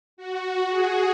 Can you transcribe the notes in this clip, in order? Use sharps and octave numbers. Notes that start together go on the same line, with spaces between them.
F#4
G#4